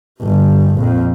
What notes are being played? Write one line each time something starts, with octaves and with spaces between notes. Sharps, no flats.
G1 G2
A#1 F2